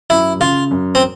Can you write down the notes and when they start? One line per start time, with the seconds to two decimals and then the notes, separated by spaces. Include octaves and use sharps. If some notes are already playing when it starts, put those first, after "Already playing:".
0.10 F#2 E4
0.40 C#3 F4
0.71 F#2
0.95 C4